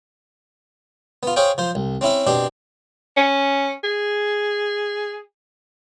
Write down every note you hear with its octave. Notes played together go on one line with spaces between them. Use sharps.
B3 F4
G#4 C5 C#5 F5 G5
F3 C5
C2
C4 C#4 E4 E5
B2 C4 D4 G4
C#4
G#4